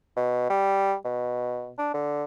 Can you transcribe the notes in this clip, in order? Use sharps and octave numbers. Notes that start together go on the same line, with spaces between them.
B2
G3
B2
D4
D3